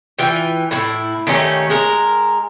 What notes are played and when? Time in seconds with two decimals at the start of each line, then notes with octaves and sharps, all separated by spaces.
0.19 E3 F4 G5
0.71 A2 E4
1.27 D#3 A3 C#4 G4
1.70 G#3 A#4